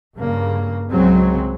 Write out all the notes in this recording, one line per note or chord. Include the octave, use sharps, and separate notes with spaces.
G2 C#3 A#3
C2 C#3 F#3 G#3 C4